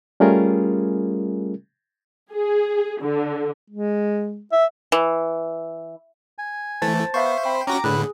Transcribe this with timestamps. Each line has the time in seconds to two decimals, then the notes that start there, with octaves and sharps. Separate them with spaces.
0.20 G3 A3 C#4 F4 G#4 A#4
2.32 G#4
3.01 D3
3.70 G#3
4.52 E5
4.92 E3
6.38 G#5
6.82 E3 A3 C5 A5 A6
7.14 B3 C5 E5 F5 C#6
7.45 C4 G5 B5
7.67 C#4 F#4 A#5 D6 A#6
7.84 A2 D3 G#4 B4 F#6